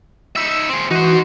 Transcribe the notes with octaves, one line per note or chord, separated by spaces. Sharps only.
D#4 E5 E6
C4 G#4
E3 D#4 F#4 C5